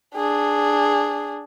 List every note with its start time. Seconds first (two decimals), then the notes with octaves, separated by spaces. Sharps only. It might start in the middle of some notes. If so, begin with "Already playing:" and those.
0.15 D4 G#4